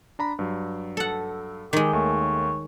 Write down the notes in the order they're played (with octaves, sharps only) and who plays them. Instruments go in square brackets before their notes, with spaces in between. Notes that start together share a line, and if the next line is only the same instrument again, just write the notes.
[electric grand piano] D4 A#5 B5
G2 F#3
[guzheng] A4 F#5
[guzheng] D#3 G#3 [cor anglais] G4
[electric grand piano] D#2 A3 [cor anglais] C#5